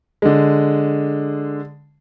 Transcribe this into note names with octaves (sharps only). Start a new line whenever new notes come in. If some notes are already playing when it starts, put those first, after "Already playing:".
D3 G#3